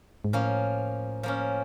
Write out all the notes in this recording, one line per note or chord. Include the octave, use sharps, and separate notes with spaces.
G#2
A2 F3 A#3 C#4
F3 A#3 C#4